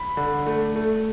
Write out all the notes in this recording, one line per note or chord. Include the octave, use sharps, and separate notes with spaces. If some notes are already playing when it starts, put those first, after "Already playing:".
Already playing: B5
D3
A3
A3